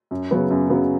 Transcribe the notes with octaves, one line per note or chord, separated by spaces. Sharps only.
F#2
C#3 F#3 B3
F#2
C#3 F#3 B3